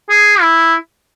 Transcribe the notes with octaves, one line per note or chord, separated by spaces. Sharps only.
G#4
E4